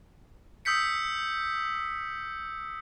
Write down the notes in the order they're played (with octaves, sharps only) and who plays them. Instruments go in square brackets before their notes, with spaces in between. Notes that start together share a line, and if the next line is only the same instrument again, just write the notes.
[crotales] D#6 E6 G6 B6 C#7